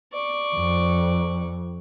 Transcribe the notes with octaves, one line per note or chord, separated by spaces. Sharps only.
D5 C#6
F2